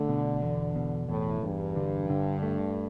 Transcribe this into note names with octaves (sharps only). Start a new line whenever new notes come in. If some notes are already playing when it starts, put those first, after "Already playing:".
Already playing: D3 A3
B2
E2
B2
E2 A2
E2 G2
D3
D3
A3